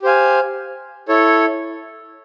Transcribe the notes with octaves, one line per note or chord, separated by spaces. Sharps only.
G4 C5 F5 G#5
E4 A4 C#5